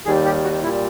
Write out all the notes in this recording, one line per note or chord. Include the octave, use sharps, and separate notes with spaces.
D#2 D#3 G3 G#4
G4
F#4
A#2 G3 E4